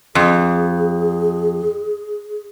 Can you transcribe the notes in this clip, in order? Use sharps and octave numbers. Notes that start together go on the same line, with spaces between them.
F2 G#4